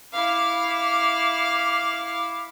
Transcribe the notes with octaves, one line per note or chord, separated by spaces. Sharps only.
E4 F5 D6